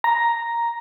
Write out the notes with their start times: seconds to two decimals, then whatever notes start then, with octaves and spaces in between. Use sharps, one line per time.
0.04 A#5